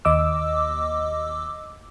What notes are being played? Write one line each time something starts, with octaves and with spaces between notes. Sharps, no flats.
D#2 D#5 D6 E6